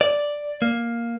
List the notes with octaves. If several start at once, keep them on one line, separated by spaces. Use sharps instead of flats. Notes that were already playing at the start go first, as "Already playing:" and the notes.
D5
A#3